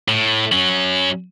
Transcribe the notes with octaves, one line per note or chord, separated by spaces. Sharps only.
A2
F#3 C#4